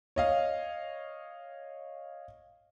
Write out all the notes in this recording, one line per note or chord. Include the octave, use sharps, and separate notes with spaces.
C#5 D#5 F5